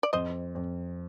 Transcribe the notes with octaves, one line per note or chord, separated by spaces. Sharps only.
D5
F2 C5 D#5
F2